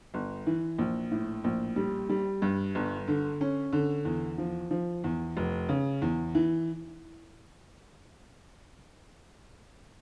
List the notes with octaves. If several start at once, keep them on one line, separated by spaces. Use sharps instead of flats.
G1
E3
A#1
A2
A#1
G3
G3
G2
G1
D3
C#4
D3
E2
F3
F3
E2
F1
C#3
E2
E3